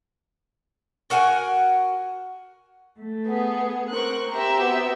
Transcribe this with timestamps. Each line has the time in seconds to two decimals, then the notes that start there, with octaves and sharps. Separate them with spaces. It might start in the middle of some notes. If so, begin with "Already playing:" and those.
1.10 F#4 A#4 F#5 G#5
2.98 A3
3.27 B3 G#4
3.89 C4 A#4 C#6 F#6
4.30 C4 G4 E5 A#5
4.60 B3 F#4